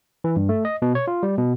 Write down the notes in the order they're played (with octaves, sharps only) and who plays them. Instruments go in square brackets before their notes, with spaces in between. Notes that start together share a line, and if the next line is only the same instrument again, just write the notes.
[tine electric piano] E3
G2
A3
D#5
B2
C#5
F4
G3
B2